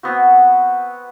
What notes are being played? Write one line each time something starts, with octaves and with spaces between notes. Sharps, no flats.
B3 C4 F#4